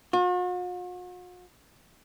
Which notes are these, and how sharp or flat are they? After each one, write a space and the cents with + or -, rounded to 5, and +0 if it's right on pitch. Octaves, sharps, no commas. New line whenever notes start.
F#4 -45